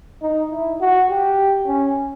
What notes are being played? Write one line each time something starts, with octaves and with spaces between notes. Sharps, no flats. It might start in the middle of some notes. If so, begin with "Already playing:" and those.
D#4
E4
F#4
G4
C#4